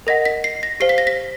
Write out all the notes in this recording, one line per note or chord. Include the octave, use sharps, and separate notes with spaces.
A#4 D#5 F#5 A#6
B6
C7
A#6
G4 C5 F5 C7
B6
A#6
B6